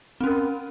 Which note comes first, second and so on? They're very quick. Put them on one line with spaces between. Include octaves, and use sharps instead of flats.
C4 C#4 A#4